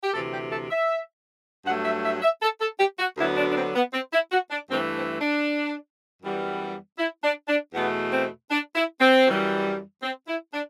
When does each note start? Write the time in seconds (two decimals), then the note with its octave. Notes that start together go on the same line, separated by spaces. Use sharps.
0.04 G4
0.13 D2 C3 E3 A4
0.33 G4
0.51 A4
0.71 E5
1.66 G2 F#3 A3 F#5
1.85 E5
2.04 E5
2.22 E5
2.42 A4
2.61 A4
2.80 G4
2.99 F#4
3.18 D2 D3 F#3 B3 E4
3.37 D4
3.51 D4
3.56 C4
3.75 B3
3.93 C4
4.13 E4
4.32 F#4
4.51 D4
4.70 G2 E3 A3 C4
4.96 C4
5.21 D4
6.23 F#2 E3 G3 B3
6.98 E4
7.24 D4
7.48 D4
7.74 E2 B2 A3 B3
8.12 C4
8.51 D4
8.75 E4
9.01 C4
9.27 F#2 E3 G3
10.02 C4
10.28 E4
10.54 D4